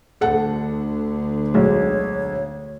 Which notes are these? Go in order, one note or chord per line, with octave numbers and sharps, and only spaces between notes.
D2 D3 A4 F#5
B1 G#3 C#5